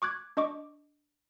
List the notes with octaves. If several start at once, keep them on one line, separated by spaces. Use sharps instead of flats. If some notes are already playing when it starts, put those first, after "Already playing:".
C#6 D6 F#6 G#6
D4 D#5 C#6 D6